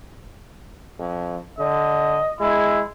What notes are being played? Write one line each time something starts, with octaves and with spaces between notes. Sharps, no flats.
F2
D3 D#5
G#3 E4